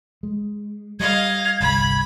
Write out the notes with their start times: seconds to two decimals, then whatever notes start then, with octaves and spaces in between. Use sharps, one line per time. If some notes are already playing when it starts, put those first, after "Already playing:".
0.23 G#3
1.00 G3 D#5 F5 G#6
1.60 G1 C2 B5